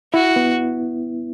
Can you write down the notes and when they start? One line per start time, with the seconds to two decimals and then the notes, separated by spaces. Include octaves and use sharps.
0.14 E4 F#4
0.36 B3